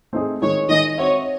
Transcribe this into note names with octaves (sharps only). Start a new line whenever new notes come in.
A3 C4 D#4 G#4
D#3 G#3 D#4 G#4 C#5
D#3 G#3 D#4 G#4 D#5
C4 F#4 C5 C#5 E5